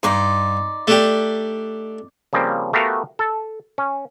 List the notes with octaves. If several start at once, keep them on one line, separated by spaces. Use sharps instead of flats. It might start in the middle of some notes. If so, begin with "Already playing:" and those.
G2 D#4 D5 C6
A3 D4 G4
C#3 F3 G3 A#3 C4
A3 B3 F#4 G4 A#4 F5
A4
C#4